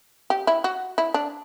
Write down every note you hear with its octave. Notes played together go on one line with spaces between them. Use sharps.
G4
E4
F#4
E4
D4